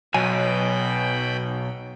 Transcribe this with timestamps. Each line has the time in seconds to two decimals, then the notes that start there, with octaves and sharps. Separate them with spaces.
0.14 B1 B2 F#3 G5 G#5 B5